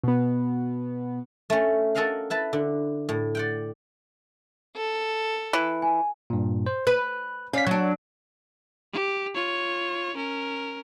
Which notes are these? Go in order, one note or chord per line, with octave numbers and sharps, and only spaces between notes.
B2 B3
A3 C#4
F#4 A4 A#4 D#5 F5 F#5
E4 B4 A5
D3
A2
D5 F#5 G5
A4
E3
G#5
G2 A#2
C5
B4 F#6
C#4 D5 F5 B6
F#3 D4 C#5
G4
F4 C#5
C#4 A#4